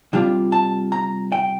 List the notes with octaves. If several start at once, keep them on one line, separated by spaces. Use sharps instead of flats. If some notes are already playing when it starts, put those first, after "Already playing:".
C3 G3 D4 F4
A5
A#5
G5